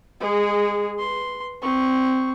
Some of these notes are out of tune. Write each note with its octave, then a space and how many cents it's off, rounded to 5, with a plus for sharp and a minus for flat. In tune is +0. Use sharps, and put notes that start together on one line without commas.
G#3 -20 G#4 +0
B4 +0 C6 +0
C4 -10 C#6 +0